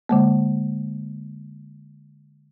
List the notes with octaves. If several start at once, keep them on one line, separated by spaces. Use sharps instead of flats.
D3 G#3 A#3